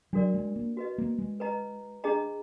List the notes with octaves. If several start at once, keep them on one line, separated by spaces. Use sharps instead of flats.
F#3 D4 F#4 A#4 D5
G#3
A#3
F#4 B4 D#5
A#3
G#3
B4 D#5 A#5
D4 G#4 D#5 A#5